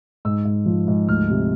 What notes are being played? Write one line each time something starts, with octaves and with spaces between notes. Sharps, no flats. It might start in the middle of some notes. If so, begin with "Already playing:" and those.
G#2 E6
G#2
F3
G#2
D2 F6
C3